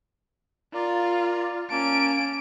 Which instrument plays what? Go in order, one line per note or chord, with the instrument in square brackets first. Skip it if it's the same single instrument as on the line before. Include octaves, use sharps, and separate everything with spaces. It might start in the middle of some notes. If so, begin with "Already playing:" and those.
[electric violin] F4 [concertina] A#4 D5
[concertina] A#3 A5 [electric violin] C#4 D7